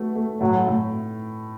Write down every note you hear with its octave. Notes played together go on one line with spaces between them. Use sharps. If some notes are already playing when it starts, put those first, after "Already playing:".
Already playing: A3 F#4 B4
A3
A2 F#3
A2